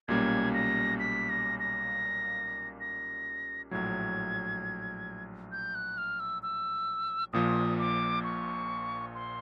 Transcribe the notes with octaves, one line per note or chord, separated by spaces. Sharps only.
B1 A#2 G3 A#3 C#4 G#6
A#6
B6
A#6
A#6
A#6
A#1 A2 F#3 G#6
G6
F#6
F6
E6
E6
A#1 A#2 F3 D#6
D6
C#6
C6